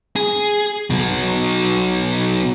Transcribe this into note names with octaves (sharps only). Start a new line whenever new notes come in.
G#4
B2 F#3